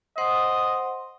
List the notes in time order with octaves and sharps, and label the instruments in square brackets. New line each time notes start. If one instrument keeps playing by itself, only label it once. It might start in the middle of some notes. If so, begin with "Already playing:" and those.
[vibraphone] C5 F#5 C6 [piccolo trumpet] D#5